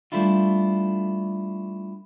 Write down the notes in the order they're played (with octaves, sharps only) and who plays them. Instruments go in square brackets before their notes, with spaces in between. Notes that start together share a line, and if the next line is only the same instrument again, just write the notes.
[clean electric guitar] G3 A3 D4 E4 F4